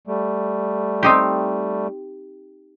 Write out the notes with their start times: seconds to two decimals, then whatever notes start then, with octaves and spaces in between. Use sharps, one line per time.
0.07 G3 A3
1.03 C4 D#4 G4